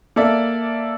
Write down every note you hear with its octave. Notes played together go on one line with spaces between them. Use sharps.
A#3 A4 D5 E5